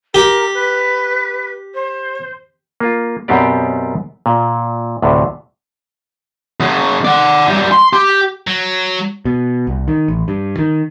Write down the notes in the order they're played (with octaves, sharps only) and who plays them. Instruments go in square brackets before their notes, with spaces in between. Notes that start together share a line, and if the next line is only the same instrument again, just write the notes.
[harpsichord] G4 [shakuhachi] A#4
[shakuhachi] B4
C5
[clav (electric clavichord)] A#3 F4
F#2 B2 B3 C4 G4 D5
A#2
D2 A2 C3
[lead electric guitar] F#2 C#3
D5 F#5
F#2 G3
C6
G4
[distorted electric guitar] F#3
[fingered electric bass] B2
C2
D#3
A1
G2
D#3